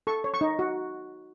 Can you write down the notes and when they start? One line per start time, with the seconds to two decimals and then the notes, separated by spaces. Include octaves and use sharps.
0.07 A4 C#6
0.24 C#5
0.34 C#6
0.41 D#4
0.59 F#4